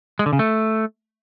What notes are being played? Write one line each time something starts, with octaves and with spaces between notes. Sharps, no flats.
G#3
D3
C#3
A3